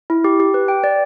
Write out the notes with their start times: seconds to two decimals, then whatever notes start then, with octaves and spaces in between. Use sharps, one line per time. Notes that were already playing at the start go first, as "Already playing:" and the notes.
0.10 E4
0.24 G4
0.40 G4
0.54 B4
0.68 G5
0.84 D5